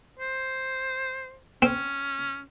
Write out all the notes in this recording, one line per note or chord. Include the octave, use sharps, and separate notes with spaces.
C5
C4 C#4